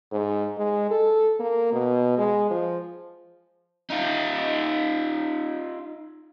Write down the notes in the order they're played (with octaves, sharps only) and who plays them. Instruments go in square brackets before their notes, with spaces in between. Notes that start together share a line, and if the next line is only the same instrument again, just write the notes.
[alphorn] G#2
G#3
A4
A#3
B2
G#3
F3
[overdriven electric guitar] D#4 F4